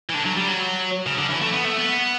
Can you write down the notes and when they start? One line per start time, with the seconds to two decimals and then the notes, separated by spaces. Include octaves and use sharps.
0.09 E3
0.14 D3
0.25 F#3
0.37 G3
0.48 F#3
1.06 C#3
1.18 D3
1.30 E3
1.42 A3
1.53 B3
1.65 A3
1.76 B3